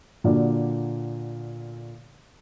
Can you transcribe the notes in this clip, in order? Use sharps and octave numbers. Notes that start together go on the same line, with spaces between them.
A#2 D3 F#4 D5